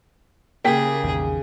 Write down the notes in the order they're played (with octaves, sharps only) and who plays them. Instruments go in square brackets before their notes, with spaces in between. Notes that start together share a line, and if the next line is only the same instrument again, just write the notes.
[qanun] C#3 G4 [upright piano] A#3 G5 B6 [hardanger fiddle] G#4
[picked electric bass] A#1 E2 D#3